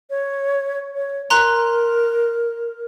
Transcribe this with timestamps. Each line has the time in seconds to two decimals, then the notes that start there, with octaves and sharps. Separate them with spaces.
0.10 C#5
0.95 C#5
1.30 A#4 A#5 C6 F#6